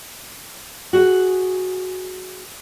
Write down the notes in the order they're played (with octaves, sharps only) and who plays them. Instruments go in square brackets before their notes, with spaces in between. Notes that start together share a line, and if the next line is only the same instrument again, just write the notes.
[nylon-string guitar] F#4 G#4